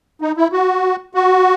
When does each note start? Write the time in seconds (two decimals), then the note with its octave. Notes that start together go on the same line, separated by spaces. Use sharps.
0.21 D#4
0.37 E4
0.52 F#4
1.14 F#4